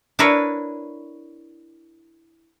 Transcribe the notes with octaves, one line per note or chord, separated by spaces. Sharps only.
D4 E4 A#4 B4 C#5